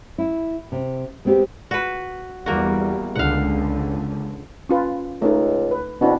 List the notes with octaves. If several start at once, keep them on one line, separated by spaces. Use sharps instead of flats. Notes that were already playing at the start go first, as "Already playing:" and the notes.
E4
C3
G#3 B3 C4 F#4 G4
F#4 B4
E2 G3 A#3 F#4
C#2 D3 F5 F#5
C#4 F4 B4
C#2 A3 D#4
B4
B2 C4 D4 E4